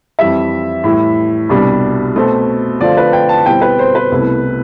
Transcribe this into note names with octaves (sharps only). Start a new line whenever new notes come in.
F2 E3 G3 E5
A2 E3 G3
C2 B2 G3 D4
B2 A3 C4
D3 F3 A3 C4 F4 D5
B4
G5
A5
B2 G3 C4 E4 G5
B4
C5
B4
C2 B2 A3 E4